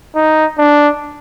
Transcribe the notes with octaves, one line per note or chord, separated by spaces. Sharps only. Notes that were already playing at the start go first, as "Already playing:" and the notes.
D#4
D4